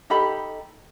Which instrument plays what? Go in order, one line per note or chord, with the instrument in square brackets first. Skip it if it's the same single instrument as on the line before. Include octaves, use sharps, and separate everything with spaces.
[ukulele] D#4 G4 A4 B5